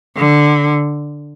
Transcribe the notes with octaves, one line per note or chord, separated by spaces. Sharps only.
D3